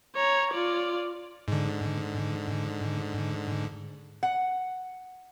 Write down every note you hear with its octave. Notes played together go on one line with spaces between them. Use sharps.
C#5 A#5
F4 D5
G#2 D3
F#5